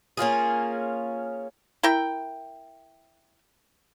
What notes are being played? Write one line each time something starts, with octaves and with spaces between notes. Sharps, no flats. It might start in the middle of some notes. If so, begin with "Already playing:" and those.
A#3 C#4 F4 G#4
E4 A#4 G5